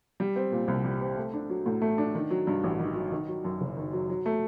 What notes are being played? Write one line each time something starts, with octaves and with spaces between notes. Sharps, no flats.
G3
C4
A#2
C2
G3
C4
A3
D4
F#3
A2
A3
D4
D#3
F#3
G2
A1
D#3
F#3
D#3
F#3
F#2
F#1
D#3
F#3
F#3
A3